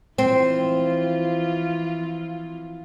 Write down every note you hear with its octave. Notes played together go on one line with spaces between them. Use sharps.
E3 F3 C4 F4